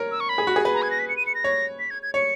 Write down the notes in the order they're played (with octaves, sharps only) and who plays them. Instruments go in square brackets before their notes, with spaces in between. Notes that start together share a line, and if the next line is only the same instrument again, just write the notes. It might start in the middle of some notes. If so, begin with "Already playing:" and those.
Already playing: [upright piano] A#4 C#5
[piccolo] E6
C#6
B5
[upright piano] G#4
F#4
G#4
B4
[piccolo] A#5
G#6
A#6
B6
C#7
D#7
C#7
A#6
[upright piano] C#5
[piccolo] B6
G#6
G#6
[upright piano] C#5 [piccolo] C#7